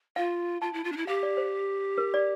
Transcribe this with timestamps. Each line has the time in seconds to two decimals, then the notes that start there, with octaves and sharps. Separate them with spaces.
0.16 F4 F5
0.62 F4 A5
0.73 E4
0.84 F4
0.92 D4
0.97 E4
1.07 G4 F5
1.23 D5
1.37 C5
1.98 A#4
2.14 D5